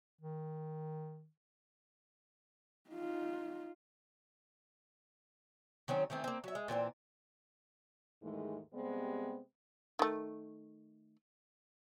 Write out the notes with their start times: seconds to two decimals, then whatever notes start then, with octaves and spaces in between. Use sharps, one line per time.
0.21 D#3
2.91 D#4 F4
5.88 D#3 F#3 C4 C#4
6.10 D#3 E3 A3 C4
6.24 A#3 C4
6.44 F#3 E5
6.55 G#3
6.68 A#2 E3 B3 C4
8.22 D#2 G#2 D#3 E3 G#3 A3
8.72 C3 G3 G#3 B3 C4
9.99 D#3 A3